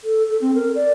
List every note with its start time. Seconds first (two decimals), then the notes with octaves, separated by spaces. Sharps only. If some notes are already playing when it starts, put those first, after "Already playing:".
0.04 A4
0.30 A4
0.41 C4
0.55 A#4
0.75 D5